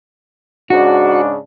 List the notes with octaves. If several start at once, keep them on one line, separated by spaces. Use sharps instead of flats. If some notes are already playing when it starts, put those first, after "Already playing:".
G#2 C#3 D4 F#4